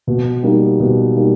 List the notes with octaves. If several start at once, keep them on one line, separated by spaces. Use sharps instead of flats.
B2
G3 A#3 D#4
B2
G3 A#3 D#4